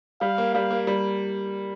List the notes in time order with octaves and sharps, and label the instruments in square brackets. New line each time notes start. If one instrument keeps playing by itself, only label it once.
[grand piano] G3 [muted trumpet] F5
[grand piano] A#3
[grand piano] G3 [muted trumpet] F5
[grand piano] A#3
G3